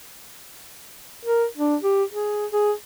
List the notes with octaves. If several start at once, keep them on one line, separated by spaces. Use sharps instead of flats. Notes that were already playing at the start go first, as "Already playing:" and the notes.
A#4
D4
G4
G#4
G#4